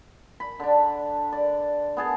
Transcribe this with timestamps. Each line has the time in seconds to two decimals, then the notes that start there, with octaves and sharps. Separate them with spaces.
0.40 B5
0.60 D3 D4
1.33 D5
1.97 B3 G#4 A5